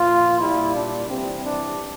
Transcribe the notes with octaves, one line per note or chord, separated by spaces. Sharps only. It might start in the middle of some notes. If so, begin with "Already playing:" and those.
Already playing: A#2 F3 F4
A#2 G3 E4
D4
C3 E3 G3 C4
D4